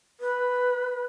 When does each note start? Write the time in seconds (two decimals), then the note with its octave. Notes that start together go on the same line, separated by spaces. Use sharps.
0.20 B4